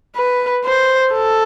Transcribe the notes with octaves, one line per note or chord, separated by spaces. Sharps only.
B4
C5
A4